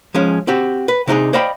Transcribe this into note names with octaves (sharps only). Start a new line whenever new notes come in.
F3 G#3 C#4
C4 F#4 G4
B4
C3 D4 D#4 G4 G#4
C5 D5 D#5 F5 G5 B5